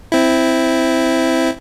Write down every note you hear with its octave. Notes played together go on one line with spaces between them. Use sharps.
C4 E4